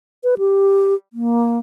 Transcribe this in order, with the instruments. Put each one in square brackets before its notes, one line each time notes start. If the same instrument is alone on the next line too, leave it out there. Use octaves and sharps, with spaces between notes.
[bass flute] B4
G4
A#3